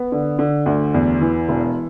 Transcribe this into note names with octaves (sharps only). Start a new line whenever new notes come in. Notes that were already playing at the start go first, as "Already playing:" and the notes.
Already playing: B3
D3
D3
D2
E2
E3
E1